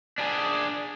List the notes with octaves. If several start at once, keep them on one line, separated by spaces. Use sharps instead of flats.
D4 G#4